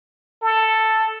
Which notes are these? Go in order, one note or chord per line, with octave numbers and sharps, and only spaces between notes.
A4